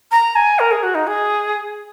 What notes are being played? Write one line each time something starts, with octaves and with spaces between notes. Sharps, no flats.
A#5
G#5
A#4
G#4
F#4
D#4
G#4